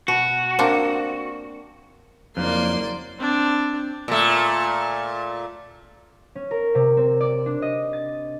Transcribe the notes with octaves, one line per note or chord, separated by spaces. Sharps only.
B2 F#4
A#3 C4 D4
F#1 F2 A#3 D5 C6
C4 D4
A#2 A3
C#4
A#4
C3
C4
D5
D4
D#5
A6